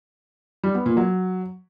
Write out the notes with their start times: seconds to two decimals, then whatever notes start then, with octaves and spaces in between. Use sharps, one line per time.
0.63 G3
0.75 B3
0.86 A#2
0.97 F#3